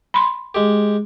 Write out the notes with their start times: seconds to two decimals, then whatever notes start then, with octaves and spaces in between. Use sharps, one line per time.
0.14 B5 C6
0.55 G#3 G4